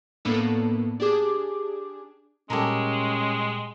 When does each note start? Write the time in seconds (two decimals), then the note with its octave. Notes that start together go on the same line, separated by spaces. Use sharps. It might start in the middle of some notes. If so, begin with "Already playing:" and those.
0.25 A2 A#3 B3 D4 A4
1.00 D4 G4 G#4 D6
2.50 A#2 G3 G#3 C#4 G4 A4 A#4